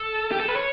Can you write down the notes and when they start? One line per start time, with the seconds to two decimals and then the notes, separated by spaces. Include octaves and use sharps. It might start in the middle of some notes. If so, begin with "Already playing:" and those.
Already playing: A4
0.32 G4
0.40 A4
0.48 B4
0.56 C#5